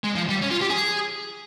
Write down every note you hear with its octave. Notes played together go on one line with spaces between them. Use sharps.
G#3
F3
G3
C#4
F4
G4
G#4